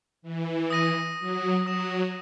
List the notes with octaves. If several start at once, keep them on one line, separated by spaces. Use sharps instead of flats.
E3
D#6 A#6 D#7
F#3
F#3 D#6 A#6 E7